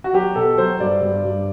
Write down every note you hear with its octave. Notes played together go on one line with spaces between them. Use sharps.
F#4
F#3 G4
B2 A4
F#3 C5
G2 D5
G2
G2